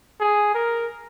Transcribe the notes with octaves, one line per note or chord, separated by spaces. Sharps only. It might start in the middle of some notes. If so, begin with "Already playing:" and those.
G#4
A#4